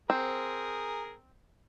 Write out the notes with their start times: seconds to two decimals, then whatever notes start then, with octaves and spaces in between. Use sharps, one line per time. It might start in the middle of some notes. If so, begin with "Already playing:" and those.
0.10 C4 G#4 A#4